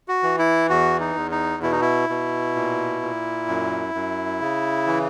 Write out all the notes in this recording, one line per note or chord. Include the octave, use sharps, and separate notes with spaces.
F#4
E3
E4
E2 F#4
D#4
E2
D#4
B2 E4
D#4
E4
B2
A#2
A#2
F#2
F#2
C#3
E3